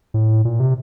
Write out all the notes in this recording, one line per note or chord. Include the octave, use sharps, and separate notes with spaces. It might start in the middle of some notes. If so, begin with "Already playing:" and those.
A2
A#2
C3